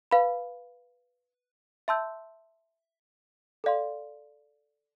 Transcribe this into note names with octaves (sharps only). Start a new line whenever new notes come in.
B4 F5 B5
E5 A5 C6 E6 G6
A4 D5 F5 C6